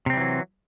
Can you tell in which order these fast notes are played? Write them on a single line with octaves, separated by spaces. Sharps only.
C3 C4 G3 E3 F#3